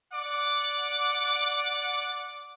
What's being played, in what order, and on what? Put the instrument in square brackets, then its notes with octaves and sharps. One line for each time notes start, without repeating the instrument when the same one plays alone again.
[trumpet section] D5 F#5 D6